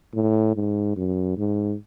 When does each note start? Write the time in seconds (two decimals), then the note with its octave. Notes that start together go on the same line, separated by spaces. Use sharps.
0.14 A2
0.56 G#2
0.96 F#2
1.37 G#2